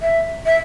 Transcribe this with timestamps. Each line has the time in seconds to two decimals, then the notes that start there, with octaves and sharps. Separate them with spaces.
0.02 E5
0.46 E5